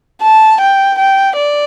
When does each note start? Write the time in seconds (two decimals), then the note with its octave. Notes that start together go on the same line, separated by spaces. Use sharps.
0.23 A5
0.60 G5
0.98 G5
1.36 D5